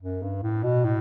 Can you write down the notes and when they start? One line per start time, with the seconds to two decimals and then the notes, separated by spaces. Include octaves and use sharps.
0.02 F#2
0.22 G2
0.43 A2
0.63 B2
0.84 A2